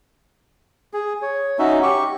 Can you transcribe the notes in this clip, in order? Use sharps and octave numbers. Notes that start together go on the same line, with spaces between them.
G#4
C#5
C#4 D#4 F#4 E5
G4 C#6